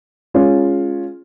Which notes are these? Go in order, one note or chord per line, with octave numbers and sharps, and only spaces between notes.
G#3 C#4 F4